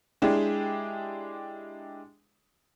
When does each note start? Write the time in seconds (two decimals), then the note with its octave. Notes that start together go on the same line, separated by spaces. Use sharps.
0.22 G#3 D4 E4 G4 G#4